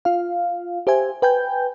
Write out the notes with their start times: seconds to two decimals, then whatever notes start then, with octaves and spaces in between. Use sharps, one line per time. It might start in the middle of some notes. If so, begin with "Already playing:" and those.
0.05 F4 F5
0.87 G4 C5 E5 G#5
1.22 B4 G5 G#5 G6